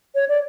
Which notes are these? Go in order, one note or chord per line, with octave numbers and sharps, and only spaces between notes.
C#5
D5